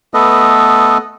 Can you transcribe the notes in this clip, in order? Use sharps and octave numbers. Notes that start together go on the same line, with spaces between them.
A3 B3 A4 B4 D#5